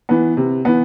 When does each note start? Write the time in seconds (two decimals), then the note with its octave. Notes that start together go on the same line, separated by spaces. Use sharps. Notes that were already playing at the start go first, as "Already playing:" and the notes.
0.09 E3 B3
0.37 C3
0.65 E3 B3